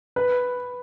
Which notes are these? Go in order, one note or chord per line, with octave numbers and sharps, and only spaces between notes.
B4